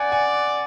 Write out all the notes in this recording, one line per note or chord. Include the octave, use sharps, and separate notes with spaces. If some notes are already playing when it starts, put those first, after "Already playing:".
Already playing: D5 F#5 G#5
G#5